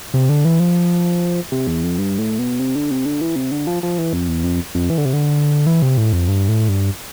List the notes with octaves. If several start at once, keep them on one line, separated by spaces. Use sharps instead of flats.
C3
D3
E3
F3
C3
E2
F2
G2
A2
B2
C3
D3
C3
D3
E3
C3
D3
F3
F3
E3
F2
E2
F2
F2
E3
D3
C3
D3
E3
C3
A2
F2
G2
A2
G2